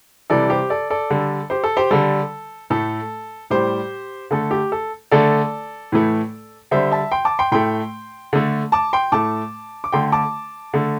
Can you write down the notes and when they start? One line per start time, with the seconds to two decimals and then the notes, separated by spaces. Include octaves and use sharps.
0.30 C3 E3 G3 A4 D5
0.50 G4 C5
0.70 A4 D5
0.90 A4 D5
1.10 D3 G3
1.50 G4 C5
1.64 A4
1.77 G4 C5
1.91 D3 G3 A4
2.70 A2 A3 A4
3.50 A2 G3 G4 C5
4.31 D3 A3 A4
4.51 G4
4.72 A4
5.11 D3 A3 A4 D5
5.92 A2 E3 A3
6.71 D3 G3 C5 E5
6.92 E5 A5
7.11 G5 C6
7.25 A5 D6
7.39 G5 C6
7.52 A2 A3 G5 C6
8.33 D3 A3
8.72 A5 D6
8.93 G5 C6
9.12 A2 A3 A5 D6
9.84 D6
9.92 D3 A3 G5 C6
10.12 A5 D6
10.74 D3 A3